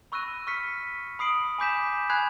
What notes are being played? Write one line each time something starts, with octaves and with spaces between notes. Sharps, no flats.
B5 C#6 E6 F#6 A#6 D#7
C#6 F6 B6 C#7
B5 D#6 C7 D7 F#7
G#5 B5 D6 G6 B6 E7
G#5 B5 F#6 G#6 C7